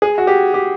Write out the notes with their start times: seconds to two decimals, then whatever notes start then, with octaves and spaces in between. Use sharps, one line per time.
0.02 G#4
0.18 F#4
0.27 G4
0.54 G4